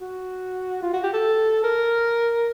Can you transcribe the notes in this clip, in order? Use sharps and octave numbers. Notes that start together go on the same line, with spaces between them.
F#4
F4
F#4
G4
A4
A#4